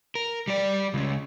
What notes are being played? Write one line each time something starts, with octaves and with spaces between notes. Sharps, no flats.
A#4
G3 D5
C#2 C#3